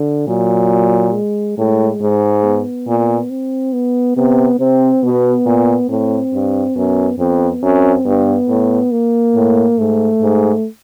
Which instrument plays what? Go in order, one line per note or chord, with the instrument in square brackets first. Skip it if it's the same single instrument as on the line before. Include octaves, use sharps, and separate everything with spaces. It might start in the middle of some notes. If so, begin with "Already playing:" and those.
Already playing: [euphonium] D3
[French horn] A#2 [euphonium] F#3
[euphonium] G#3
[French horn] A2 [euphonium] G#3
[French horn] G#2
[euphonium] B3
[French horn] A#2
[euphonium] C4
B3
[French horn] C3 [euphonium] B3
[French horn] C3 [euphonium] C4
[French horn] B2 [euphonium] B3
[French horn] A#2
[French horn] A2 [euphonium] C4
[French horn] G2
[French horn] F#2 [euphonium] B3
[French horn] F2 [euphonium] B3
[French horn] F#2 [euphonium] C4
[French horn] G2 [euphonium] B3
[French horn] A2
[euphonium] A#3
[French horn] A2
[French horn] G#2 [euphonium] A3
[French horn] G#2